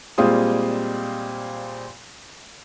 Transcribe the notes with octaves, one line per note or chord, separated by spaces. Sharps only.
A#2 G3 G#3 C4 F4 D#6